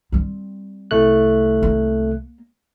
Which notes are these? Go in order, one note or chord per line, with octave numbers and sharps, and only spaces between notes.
G3 C4
C2 A3 F#6
A#3